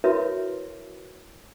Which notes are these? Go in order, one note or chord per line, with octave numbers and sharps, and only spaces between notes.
E4 F#4 A#4 B4 C#5 E5